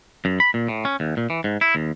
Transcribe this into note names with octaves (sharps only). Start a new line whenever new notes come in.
F#2
B5
A#2
A2
C#4
D#2
A#2
E3
G#2
E4
D#2